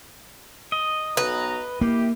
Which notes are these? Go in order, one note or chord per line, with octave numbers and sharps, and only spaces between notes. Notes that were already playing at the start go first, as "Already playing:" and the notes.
D#5
B1 B2 B4 A#5
A#3 E4 G4